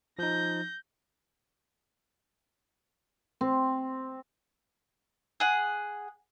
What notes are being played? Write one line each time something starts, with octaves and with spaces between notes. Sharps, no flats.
F3 D#4 G6 A#6
C4
G#4 F#5